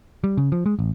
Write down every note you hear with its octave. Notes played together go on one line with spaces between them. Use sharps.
G3
C#3
F3
G#3
A1